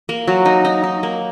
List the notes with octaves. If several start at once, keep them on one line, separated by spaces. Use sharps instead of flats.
A#3
F#3
D#4
D#4
D#4
A#3